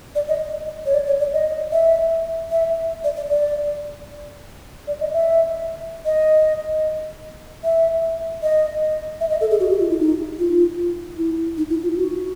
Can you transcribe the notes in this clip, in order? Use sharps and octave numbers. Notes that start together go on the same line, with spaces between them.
D5
D#5
C#5
D5
C#5
D5
D#5
E5
E5
D5
D5
D5
D5
D#5
E5
D#5
E5
D#5
E5
D#5
A4
G#4
F#4
G4
F4
E4
D#4
F4
E4
D#4
E4
F4
F#4